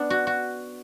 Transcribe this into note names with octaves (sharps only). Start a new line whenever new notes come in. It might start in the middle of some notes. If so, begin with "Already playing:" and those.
Already playing: B3 D4
F#4
F#4